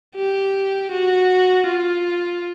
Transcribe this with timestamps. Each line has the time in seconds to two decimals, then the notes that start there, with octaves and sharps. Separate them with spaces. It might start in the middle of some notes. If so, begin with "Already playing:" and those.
0.16 G4
0.91 F#4
1.67 F4